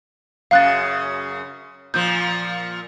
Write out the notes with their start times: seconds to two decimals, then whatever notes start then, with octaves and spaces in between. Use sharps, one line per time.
0.51 F#2 C#3 F5 F#6 A6
1.94 A#2 F3 G6